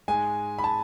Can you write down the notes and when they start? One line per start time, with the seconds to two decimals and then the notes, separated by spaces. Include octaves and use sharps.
0.08 G#2 G#3 G#5
0.59 B5
0.64 A5